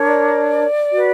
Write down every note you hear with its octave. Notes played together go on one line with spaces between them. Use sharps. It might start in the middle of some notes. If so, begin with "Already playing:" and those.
Already playing: D4 A#4 C#5
D5
F#4 B4